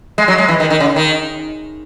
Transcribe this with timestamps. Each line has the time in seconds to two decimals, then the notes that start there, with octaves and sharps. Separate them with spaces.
0.18 G#3
0.28 F#3
0.38 G#3
0.48 E3
0.60 D#3
0.70 D#3
0.80 C#3
0.96 D#3